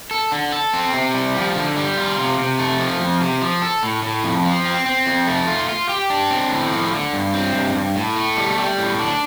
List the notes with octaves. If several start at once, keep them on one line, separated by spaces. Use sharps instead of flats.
A4
D3
A4
C4
C3
G3
F3
D3
G3
F4
C3
C3
A3
F3
F2
C3
F3
A4
A2
A2
F2
F3
C4
C4
F2
A3
F4
F4
G4
D4
C4
A2
F3
D3
G2
C4
G2
G2
A2
A3
G3
G3
A2
D4